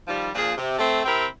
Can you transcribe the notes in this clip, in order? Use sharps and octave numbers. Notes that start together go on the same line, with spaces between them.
D#3 F3 G3
A#2 F3 D4 G#4
C3
A3 C4
C3 C4 E4 A#4